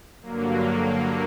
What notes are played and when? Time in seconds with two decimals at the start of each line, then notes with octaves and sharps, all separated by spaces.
0.22 G2 D3 F#3 A#3